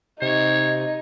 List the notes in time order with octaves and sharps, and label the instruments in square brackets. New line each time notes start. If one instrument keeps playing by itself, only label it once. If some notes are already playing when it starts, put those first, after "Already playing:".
[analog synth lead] C3 [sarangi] D#4 [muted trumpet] C#5